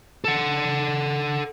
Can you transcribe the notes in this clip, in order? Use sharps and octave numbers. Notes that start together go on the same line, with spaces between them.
A4 F#5